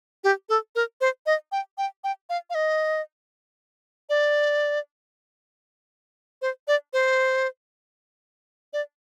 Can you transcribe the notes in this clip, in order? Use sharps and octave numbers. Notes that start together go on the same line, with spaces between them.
G4
A4
A#4
C5
D#5
G5
G5
G5
F5
F5
D#5
D5
C5
D5
C5
D5